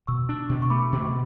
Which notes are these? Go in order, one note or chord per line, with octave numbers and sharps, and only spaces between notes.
B2 C#6 E6
D4
B2
C#6
A3 B5 D6
B2